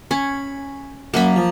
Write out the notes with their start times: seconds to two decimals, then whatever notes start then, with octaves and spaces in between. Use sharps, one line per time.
0.11 C#4 B5
1.14 F#2 A#3 F#5 B5
1.36 F3